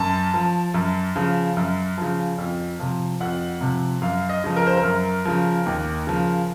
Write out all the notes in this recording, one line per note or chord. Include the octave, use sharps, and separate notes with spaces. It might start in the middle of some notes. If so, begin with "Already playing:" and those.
Already playing: F#2 A5
F3
F#2
C#3 F3
F#2
C#3 F3
F2
C3 F3
F2 F#5
C3 F3
F#2 F5
D#5
C#3 F3
A#4
C5
A#4
F#2
C#3 F3
D#2
C#3 F3